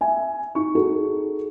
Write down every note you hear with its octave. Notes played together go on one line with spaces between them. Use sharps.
E5 G#5
D#4 C#6
D#4 F#4 G#4 A4